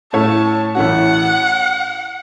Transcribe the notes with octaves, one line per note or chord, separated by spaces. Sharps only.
A2 A3 C#4 A4 C#5 A5
A1 A2 A3 C#4 F#4 F#5